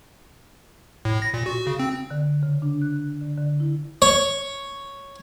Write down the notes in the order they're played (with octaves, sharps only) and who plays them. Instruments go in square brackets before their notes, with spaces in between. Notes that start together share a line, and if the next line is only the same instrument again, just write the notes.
[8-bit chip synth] A2
A#6
A#2
F#4
C#3
C4
[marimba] D3
C#3
D4
F#6
D3
D3
E4
[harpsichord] C#5